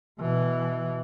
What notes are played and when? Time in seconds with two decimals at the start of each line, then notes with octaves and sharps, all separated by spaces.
0.19 B2 E3